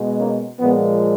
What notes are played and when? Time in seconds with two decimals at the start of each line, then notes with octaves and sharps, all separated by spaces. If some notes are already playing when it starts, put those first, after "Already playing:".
Already playing: B2 G#3
0.18 A#3 C#4
0.60 A#2 F3 G#3 B3